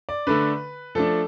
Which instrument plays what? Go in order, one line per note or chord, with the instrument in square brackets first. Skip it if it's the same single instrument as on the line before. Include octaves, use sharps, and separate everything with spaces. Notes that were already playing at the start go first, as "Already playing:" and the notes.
[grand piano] D5
D3 A3 D4 B4
F3 A3 D4 A4